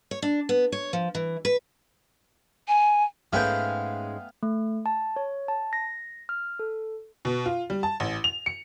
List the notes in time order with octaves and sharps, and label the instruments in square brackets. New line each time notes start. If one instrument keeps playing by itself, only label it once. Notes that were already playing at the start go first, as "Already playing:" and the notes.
[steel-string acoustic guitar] C#5
D4
B3
C#5
F3
E3
B4
[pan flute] G#5
[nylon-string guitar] G#2 G#3 C#4 [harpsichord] A3 B3 G5 [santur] F5 G#5
[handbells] A3
A5
C#5
A5
A#6
F6
A4
[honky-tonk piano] B2
F4
G3
A5
A1
F7
C#7